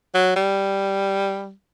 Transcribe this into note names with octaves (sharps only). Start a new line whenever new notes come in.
F#3
G3